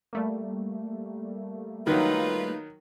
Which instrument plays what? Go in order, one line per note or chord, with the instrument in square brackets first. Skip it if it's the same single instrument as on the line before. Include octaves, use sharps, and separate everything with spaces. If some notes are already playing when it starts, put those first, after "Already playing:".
[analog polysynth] G3 A3 A#3
[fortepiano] D#3 F#3 [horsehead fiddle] D#4 [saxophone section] F4 B4